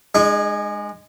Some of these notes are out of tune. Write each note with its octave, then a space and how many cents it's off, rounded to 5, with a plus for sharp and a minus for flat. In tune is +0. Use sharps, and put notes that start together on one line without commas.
G#3 -5 D#4 -45